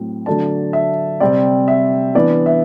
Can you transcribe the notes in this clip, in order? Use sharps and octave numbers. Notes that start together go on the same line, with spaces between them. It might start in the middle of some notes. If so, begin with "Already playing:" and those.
Already playing: A2 F#3 C4
D3 F#3 A3 D4 A5
E5
C3 G3 C4 D5
E5
E3 B3 D4 D5
E5